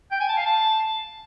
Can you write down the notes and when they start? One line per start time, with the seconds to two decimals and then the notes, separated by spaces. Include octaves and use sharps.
0.12 G5
0.20 G#5
0.29 A5
0.37 F5
0.46 A5